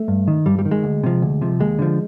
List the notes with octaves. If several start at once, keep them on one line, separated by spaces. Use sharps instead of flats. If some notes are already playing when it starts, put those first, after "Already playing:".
Already playing: A3
G2
D#3
G2 G3
G3
D#3
G#3
D2
C3 F3
D2
C3 F3
D#2 G#3
D3 F3